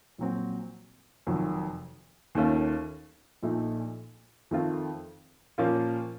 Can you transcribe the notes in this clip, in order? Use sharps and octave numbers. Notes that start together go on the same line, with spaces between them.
A#1 A#2 F#3 C4
F1 F2 D#3 F#3
D#2 D#3 A3 C#4 F4
A#1 A#2 A3 D#4
F2 D#3 A3 C4 F4
A#2 F3 A#3 C#4 F4